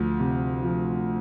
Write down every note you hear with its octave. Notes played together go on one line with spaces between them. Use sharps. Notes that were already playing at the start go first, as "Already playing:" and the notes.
Already playing: D2 F3
C3
F3